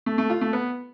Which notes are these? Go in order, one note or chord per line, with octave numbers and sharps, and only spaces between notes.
A3
A3
F4
A3
B3